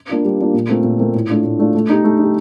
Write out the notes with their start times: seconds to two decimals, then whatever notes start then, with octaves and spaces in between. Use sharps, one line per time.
0.09 A#3 D4 F4
0.25 G3
0.40 A#3 D4 F4
0.54 A#2
0.69 A3 C4 F4 A#4
0.84 A#2
0.99 A3 C4 F4 A#4
1.14 A2
1.29 A3 D4 F4
1.45 A2
1.59 A3 D4 F4
1.75 A3
1.89 D#4 G4
2.04 A3
2.19 D#4 G4